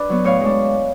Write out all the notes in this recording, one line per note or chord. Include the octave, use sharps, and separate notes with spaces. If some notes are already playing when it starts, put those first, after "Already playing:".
Already playing: D4 B4 D5
F#3 B3
A2 C#5 F5
G#3 D4